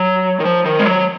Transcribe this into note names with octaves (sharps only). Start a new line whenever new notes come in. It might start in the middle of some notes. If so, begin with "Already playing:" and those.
Already playing: F#3
D#3
F3
D#3
G#3
F#3